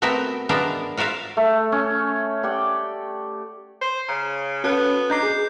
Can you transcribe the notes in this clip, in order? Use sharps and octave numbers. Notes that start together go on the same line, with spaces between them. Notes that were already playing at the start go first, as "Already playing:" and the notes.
A3 B3 C4 F#4 A#4 E5
G#3 B3 D4 A#4 E5 F5
F4 F#4 A#4 E5 F5
A3
C#4
G4 D5 F#5 G5
C5
C#3 A#5
B3 C#4 F#4 A4 A5 F#6
D4 D#5 A#5 D6 G6 C7
G#4